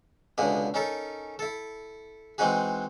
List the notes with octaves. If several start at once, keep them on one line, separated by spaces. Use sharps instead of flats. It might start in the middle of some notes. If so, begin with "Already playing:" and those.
C#2 B2 D3 E4 G#4
C#4 D#4 A4 A#4
E4 A4
E3 G#3 C4 D#4 F#4 G#4